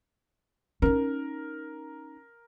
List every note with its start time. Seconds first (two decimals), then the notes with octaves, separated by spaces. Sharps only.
0.82 C#4 D#4 A#4